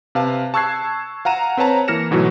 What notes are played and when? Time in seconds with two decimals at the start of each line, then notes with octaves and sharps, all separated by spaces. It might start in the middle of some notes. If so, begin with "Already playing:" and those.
0.15 C3 B4 F5 A5
0.54 A5 C#6 E6 F#6 G#6 C7
1.25 F5 F#5 A#5 D#7 E7
1.57 C4 B4 C#5 A5 A#5
1.88 E3 A#3 F6 A#6 C#7 E7
2.11 G#2 B2 E3 F#3 A3